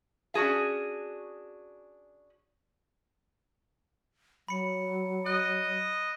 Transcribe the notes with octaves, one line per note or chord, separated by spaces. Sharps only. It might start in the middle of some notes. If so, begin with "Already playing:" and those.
C#4 D4 F#4 G#4 F5
F#3 B5 C#7
D#5 F#6